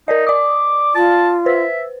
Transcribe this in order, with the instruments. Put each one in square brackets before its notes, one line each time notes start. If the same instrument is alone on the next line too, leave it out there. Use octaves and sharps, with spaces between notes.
[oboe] D#4 [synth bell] A#4 D5 D#5
[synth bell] D5 D#6 [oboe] D6
[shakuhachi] F4 [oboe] A5
[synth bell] B4 C5 [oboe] E5